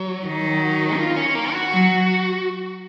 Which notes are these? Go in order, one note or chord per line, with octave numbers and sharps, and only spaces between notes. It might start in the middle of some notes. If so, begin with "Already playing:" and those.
Already playing: F#3
D#3
F4
C#4
A#3
F#4
F#3